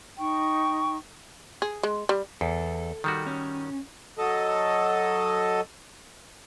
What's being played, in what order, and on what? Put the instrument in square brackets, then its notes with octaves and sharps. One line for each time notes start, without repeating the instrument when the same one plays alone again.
[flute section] D#4 G5 C#6
[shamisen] G#4
G#3
G3
[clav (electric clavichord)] E2 [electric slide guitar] A4
[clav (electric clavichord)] D#3 G3 F#4
[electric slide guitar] C#4
[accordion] F#3 A4 D#5